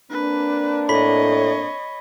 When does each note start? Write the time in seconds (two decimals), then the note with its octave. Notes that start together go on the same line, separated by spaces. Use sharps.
0.11 A#3 C4 D4 B4
0.89 A2 C#5 D#5 B5 B6